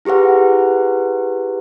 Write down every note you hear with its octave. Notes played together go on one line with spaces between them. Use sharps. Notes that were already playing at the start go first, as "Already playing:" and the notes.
E4 G4 G#4 B4 F#5